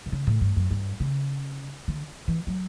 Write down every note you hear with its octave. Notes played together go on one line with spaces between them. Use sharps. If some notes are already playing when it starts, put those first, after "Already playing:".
B2
C#3
A2
G2
F#2
G2
C#3
D3
E3
F#3